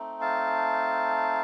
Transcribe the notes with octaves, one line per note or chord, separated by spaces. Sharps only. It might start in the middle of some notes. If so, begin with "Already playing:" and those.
Already playing: A3 C4 D#4
F5 A5